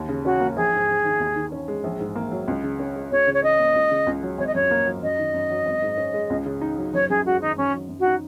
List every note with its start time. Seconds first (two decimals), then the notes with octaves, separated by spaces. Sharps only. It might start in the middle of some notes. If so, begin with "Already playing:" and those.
Already playing: D#2
0.08 C#3
0.25 C#4 F#4
0.40 A#3
0.56 A#1 G#4
0.72 G#2
0.88 A#1
1.05 D#3
1.20 D#2
1.36 D#3
1.52 C#4
1.68 G#3
1.84 A#1
2.00 G#2
2.15 A#3
2.32 F#3
2.48 C#2
2.63 C#3
2.79 C#4
2.95 G#3
3.12 C#2 C#5
3.27 C#3
3.34 C#5
3.43 C#4 D#5
3.59 A#3
3.75 C#2
3.91 C#3
4.07 C#2
4.23 F#3
4.38 G#1 C#5
4.47 D#5
4.55 F#2 C#5
4.71 A#3
4.86 F#3
5.03 F#2 D#5
5.18 D#3
5.34 F#2
5.50 F#3
5.66 G#1
5.82 G#2
5.98 C#4
6.14 G#3
6.30 C#2
6.46 C#3
6.61 D#4
6.78 F#3
6.93 F#1 C#5
7.10 F#2 G#4
7.25 G#3 F#4
7.41 D#3 D#4
7.57 F#2 C#4
7.73 F#3
7.89 F#2
8.00 F#4
8.05 D#4